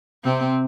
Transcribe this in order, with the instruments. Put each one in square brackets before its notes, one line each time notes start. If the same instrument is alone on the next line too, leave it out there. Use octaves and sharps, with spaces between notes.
[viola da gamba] C3 C4